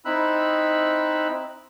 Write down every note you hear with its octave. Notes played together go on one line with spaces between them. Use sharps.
C4 D#4 E4 B5 E6 F#6